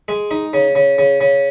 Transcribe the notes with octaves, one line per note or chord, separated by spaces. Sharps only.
G#3
D#4
C#3
C#3
C#3
C#3